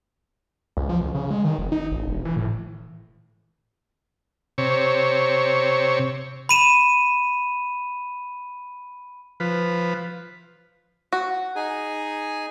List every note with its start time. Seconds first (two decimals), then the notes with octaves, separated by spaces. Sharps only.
0.77 C#2
0.89 F3
1.01 C#2
1.15 C#3
1.30 G#3
1.45 D#3
1.58 F1
1.72 D#4
1.91 A1
2.06 E1
2.25 E3
2.36 A2
4.58 C3 C#5
6.49 B5 D#7 E7
9.40 F3 B4
11.13 F#4
11.56 D#4 G#4 G#5